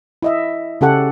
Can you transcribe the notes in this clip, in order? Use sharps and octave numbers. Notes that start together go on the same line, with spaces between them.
E4 D#5 E5
C#3 C#4 G4 A4 F#5